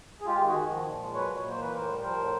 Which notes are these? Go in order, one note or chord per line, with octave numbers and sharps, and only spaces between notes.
G#4
G#3 F4 G4
D#3
F#4 G#4
D#3
F3
A#2
G#3
F#3 B4 C#5
A#2
C#5
A#3 C5
E3 B4
A2 A#4 C5
G3
F3 A#4 C5
A2